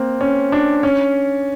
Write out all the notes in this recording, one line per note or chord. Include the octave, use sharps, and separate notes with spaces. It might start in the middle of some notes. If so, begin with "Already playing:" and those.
Already playing: A#3 C4
C#4
D4
C#4